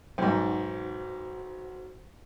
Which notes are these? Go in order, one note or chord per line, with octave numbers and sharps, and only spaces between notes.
B1 G#2 F#4 C5